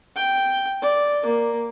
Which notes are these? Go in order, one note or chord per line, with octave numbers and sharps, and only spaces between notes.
G5
D5
A#3